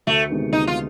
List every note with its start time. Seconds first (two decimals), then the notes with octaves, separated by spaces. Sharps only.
0.07 D2 A3
0.30 C3 D#3 G#3 B3
0.52 D2 D#4
0.67 F4